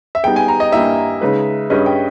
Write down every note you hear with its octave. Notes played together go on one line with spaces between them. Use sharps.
E5
G3 B3 D#4 G#4 G5
G#5
A#5
D#5
G2 G3 A#3 E4 E5
C#3 G#3 D#4 G#4 B4
G2 G3 C#4 G#4 B4 D#5
G5